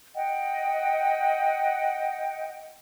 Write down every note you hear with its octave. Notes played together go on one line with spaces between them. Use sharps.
D#5 F#5 G5